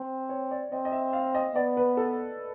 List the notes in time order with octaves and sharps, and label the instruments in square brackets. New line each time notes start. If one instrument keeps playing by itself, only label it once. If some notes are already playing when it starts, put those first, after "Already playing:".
Already playing: [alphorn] C4
[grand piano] C#5
D5
[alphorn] C4 [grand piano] D#5
[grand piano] D#5
E5
F5
D#5
[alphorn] B3 [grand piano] D5
[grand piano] B4
A4